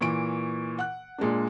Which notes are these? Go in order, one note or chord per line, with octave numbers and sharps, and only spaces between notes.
A#2 E3 C#6 D7
F#5 F#6
A#2 G#3 A#3 D4